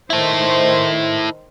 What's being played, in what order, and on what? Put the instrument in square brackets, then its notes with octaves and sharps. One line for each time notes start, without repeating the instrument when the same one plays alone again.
[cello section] D#3 C5 [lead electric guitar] E4 A4